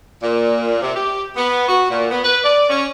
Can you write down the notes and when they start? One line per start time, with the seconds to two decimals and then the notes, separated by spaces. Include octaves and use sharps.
0.23 A#2
0.82 C3
0.96 G4
1.36 B3
1.69 F#4
1.90 A#2
2.11 B3
2.24 B4
2.44 D5
2.70 C#4